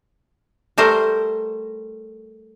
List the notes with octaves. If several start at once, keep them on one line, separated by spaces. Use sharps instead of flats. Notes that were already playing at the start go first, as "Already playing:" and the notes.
G3 A3 A#4 C5